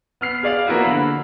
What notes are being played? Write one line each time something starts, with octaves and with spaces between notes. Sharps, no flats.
B3 F6 C7
G#4 D5 F5
F3 A#3 B3 E4 F#4
D3 B5